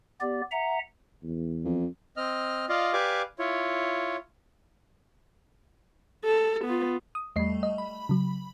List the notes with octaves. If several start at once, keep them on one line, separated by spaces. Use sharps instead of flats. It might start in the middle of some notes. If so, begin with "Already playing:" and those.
B3 G4 D5
E5 F#5 A#5
E2
F2
C4 D#5 F6
F4 D5 D#5 F5
G4 B4 D5 F5 G#5 D6
E4 F4 C#5
A4
B3 F4
D#6
E2 G3 A3 D#5 C7
D#5
B5
C#3 F#3